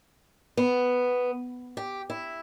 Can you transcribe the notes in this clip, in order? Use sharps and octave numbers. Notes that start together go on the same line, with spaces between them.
B3
G4
E4